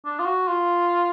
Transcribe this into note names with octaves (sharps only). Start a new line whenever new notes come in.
D4
F4
F#4
F4